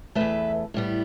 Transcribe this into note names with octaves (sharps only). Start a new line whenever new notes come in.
B2 A3 B4 E5
E2
A2 G3 B3